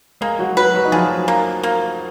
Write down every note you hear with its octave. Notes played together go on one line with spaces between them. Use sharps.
G#3 A#3 G#4
F#3 F#4
F#3 F#4 B4
F#3 F#4
D#4
F3 F4 G#4
A#3
A#3